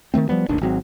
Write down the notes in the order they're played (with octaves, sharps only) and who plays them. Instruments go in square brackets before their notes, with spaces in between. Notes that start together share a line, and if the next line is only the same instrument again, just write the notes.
[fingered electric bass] D#3 F3 A3 C4
F3 G3 B3
E1 A1 D#2 D4
G#1 F#3 C4